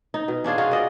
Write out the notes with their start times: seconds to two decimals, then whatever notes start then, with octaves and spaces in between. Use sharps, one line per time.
0.14 D#4
0.28 B2
0.44 C#4 D4 F4 G#4
0.58 D#4 F4 F#4 G#4
0.71 D5 D#5